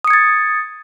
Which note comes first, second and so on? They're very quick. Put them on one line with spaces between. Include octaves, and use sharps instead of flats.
D#6 C#7 G#6 A6